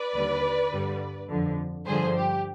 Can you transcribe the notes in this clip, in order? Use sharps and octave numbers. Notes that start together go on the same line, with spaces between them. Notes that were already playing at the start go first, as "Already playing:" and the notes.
Already playing: B4 D5
D#2 D3 G3
G2 D3 G3
F2 D3 F3
G2 D3 F3 G#4 C5
G4